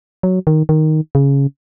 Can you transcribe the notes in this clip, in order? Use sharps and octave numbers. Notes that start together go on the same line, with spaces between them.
F#3
D#3
D#3
C#3